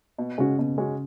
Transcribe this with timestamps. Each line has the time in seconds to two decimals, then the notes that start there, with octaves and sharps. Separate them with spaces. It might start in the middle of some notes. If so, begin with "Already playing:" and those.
0.18 B2
0.38 C#3 G#3 C#4 F#4
0.59 B2
0.78 G#3 C#4 F#4